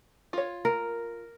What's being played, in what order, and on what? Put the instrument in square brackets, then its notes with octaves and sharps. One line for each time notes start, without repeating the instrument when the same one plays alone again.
[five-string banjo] F4 C#5
[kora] A#4